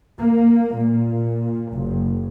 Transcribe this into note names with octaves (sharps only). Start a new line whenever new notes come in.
A#3
A#2
F#1